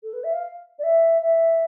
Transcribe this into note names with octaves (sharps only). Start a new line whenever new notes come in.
A4
B4
E5
F5
D5
E5
E5